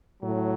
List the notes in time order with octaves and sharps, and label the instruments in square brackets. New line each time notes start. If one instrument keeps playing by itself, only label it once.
[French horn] A2 [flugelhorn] F#3